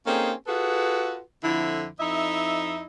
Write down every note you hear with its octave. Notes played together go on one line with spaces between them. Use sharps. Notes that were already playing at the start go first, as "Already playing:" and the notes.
A#3 C4 C#4 D#4 G#4 A4
F4 F#4 G#4 A4 B4
F2 D3 F3 E4
F2 D#4 E4 D#5 E5